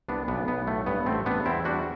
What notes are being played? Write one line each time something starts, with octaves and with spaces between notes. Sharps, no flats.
C2 B3 D4
B1 B3 D4
B1 B3
A2 A3
G2 B3
A1 A3 C4
G3 B3 D4
E2 C4 E4
G3 D4 F#4